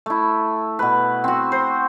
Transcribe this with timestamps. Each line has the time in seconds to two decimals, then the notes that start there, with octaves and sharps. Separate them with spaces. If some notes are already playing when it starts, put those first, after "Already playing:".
0.06 A3 E4
0.79 B2 B4
1.24 C4 F#4
1.52 C5